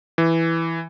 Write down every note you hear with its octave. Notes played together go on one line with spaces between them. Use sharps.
E3